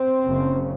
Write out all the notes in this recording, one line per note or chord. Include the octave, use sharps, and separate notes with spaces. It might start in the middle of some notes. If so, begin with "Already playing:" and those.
Already playing: C4
F#1 F#2 C#3